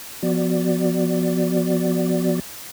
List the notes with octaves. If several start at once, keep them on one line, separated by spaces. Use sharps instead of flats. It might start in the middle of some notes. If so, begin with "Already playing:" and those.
F3 B3 F#4 D5